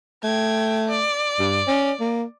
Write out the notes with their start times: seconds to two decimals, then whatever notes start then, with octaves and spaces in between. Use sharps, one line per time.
0.24 A3 G5 G#6
0.89 D5
1.39 G2
1.67 C#4
2.00 A#3